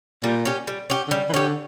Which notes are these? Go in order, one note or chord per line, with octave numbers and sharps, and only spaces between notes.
A#2 G3
C#4 G4
G3
C#4 G4
D3
C#3 G3
E3
D3 C#4 G4